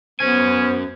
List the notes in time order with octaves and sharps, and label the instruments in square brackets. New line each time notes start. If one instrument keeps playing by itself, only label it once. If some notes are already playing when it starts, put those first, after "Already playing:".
[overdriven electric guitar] F#2 G#5 [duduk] B3 [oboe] C#4 [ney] C5